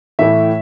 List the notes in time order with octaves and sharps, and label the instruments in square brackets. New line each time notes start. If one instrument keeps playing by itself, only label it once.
[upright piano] A2 E3 A3 E4 E5